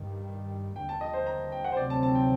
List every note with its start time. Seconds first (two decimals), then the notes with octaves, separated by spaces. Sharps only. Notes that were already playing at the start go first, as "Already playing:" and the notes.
Already playing: G2 D#3 G3
0.76 D#2 D3 G3 A#3 G5
0.89 A5
1.01 D#5
1.13 C5
1.26 A#5
1.52 G5
1.64 F#5
1.72 C5
1.77 D2 C3 D#3 F#3 C4 D5
1.90 A5
2.03 A5
2.15 G5